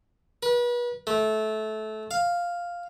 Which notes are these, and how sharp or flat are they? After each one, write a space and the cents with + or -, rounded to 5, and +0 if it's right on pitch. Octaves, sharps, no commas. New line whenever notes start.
B4 -35
A3 -20
F5 +0